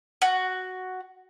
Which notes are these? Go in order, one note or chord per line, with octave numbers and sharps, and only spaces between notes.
F#4